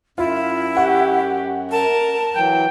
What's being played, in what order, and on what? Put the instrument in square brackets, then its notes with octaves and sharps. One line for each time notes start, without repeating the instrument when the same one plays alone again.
[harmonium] F#2 [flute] E4 [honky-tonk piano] F4
[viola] G4 [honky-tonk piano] F#5 C#6
[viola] A#4 [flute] A5
[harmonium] E3 F#3 [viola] G5